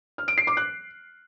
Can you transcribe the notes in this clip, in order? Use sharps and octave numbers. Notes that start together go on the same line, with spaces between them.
F6
D7
C7
D6
F#6